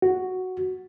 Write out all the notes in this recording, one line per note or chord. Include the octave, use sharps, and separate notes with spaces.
F#4